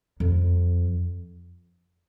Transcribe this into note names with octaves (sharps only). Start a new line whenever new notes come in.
F2